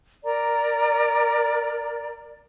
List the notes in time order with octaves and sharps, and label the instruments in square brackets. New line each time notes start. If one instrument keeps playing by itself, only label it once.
[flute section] A#4 D5 A#5